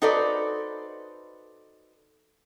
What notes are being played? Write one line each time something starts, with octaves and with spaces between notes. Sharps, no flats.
D#4 F#4 A4 B4 C5 D5